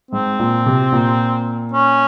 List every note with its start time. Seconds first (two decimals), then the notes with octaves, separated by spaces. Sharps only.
0.11 G#2 C4
0.39 A#2
0.66 C3
0.92 A#2
1.73 C#4